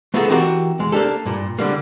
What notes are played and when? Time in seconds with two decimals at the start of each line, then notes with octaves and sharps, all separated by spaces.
0.14 A3 B3 D#4 F4 G#4 A4
0.30 E3 C4 D#4 F#4 G4 A#4
0.79 E2 G#3
0.92 A#3 B3 D4 G4 A4
1.25 G2 A#2
1.59 D3 G3 A#3